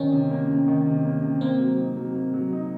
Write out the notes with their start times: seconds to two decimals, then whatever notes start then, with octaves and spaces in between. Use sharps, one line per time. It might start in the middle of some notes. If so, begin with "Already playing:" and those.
Already playing: D#3 C#4
0.12 C3
0.31 A#3
0.50 C3
0.68 D#3
0.86 C3
1.05 A#3
1.23 C3
1.41 A#3 C4
1.60 F#3
1.79 D#4
1.97 F#3
2.15 A#3
2.34 F#3
2.52 D#4